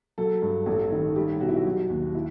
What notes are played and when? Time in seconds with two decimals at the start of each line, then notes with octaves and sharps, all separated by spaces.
0.18 F#3 A4
0.42 G2
0.66 A1 A4
0.92 D#3
1.16 G3 G4
1.41 B2 F#4
1.49 E4
1.56 F#4
1.65 F#3
1.89 D#2
2.15 E4